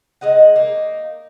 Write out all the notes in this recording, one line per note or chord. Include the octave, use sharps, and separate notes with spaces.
E3 G#3 D#5 F#5
A#3 D#4